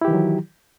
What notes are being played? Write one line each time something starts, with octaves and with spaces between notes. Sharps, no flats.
D#3 E3 F#3 E4 G4